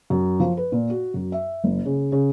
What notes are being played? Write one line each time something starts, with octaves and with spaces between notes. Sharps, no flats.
F#2
F3
B4
A#2
F#4
F#2
E5
F#1
C#3
C#3